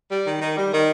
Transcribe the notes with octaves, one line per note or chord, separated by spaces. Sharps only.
G3
D#3
D#3
G3
D#3